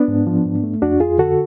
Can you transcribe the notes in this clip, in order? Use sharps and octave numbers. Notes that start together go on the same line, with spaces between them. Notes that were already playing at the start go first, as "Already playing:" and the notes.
Already playing: B3 D4
G#2
F3
G#2
A3
F2 D4 F#4
F2 F4 G#4
D3 F#4 A4